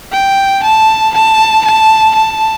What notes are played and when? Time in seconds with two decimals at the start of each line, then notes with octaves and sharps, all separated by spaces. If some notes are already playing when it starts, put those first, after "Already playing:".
0.12 G5
0.63 A5
1.14 A5
1.65 A5
2.15 A5